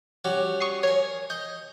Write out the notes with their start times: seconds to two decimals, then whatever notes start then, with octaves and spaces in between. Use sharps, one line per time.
0.25 G3 C#4 F#4
0.60 C#6 D#6 C7
0.83 A#4 C#5 G#5
1.30 D#5 G6